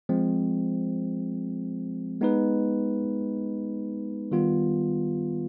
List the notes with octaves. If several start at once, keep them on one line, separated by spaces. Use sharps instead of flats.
F3 G#3 C4
G#3 B3 D#4 B4
D#3 G3 B3 F4